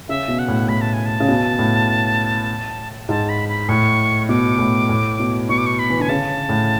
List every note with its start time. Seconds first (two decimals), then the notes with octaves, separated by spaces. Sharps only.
0.09 C#3 E5
0.28 B2
0.39 F#5
0.48 A2
0.68 A2 B5
0.81 A5
0.94 G#5
1.06 A5
1.20 C#3
1.28 B2
1.59 A2
3.09 G#2 A5
3.29 B5
3.49 B5
3.69 A2 C#6
4.29 B2 D6
4.58 A2
4.89 A2
5.20 B2
5.49 B2 C#6
5.58 D6
5.66 C#6
5.79 B5
5.90 E3
6.00 D3 G#5
6.09 C#3 A5
6.49 A2